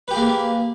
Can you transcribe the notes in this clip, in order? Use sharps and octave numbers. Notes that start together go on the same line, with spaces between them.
A#3 G4 G#4 B4